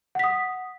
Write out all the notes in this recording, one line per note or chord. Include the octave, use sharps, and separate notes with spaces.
F#5 D#6 B6